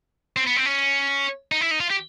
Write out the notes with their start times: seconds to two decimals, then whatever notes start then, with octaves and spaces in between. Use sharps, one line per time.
0.36 C4
0.47 B3
0.56 C4
0.66 C#4
1.52 D#4
1.61 E4
1.71 D#4
1.80 F4
1.90 G4